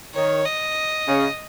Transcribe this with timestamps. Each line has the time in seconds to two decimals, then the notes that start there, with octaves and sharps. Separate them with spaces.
0.15 D#3 C#5
0.46 D#5
1.08 C#3